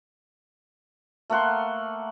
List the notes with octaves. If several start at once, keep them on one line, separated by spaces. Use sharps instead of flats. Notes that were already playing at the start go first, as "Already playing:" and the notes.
A3 A#3 F#5 C6